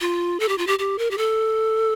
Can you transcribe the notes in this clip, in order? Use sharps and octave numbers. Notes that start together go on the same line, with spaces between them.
F4
A4
G4
F4
G4
G4
A#4
G4
A4